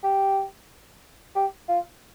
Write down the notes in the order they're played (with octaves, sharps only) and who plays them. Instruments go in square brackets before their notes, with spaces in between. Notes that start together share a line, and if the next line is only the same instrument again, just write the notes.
[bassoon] G4
G4
F4